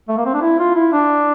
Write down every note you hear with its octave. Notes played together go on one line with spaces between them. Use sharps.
A3
A#3
C4
D4
E4
F4
E4
D4